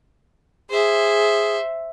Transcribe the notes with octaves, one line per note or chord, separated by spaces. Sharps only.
G#4 C5 E5